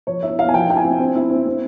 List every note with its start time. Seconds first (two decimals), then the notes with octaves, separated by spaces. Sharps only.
0.07 F3 C#5
0.22 E4 E5
0.38 E4 F5
0.49 G#5
0.53 F3 G5
0.69 E4 G5
0.77 G#5
0.84 C4
0.99 C4
1.15 E4
1.30 C4
1.47 C4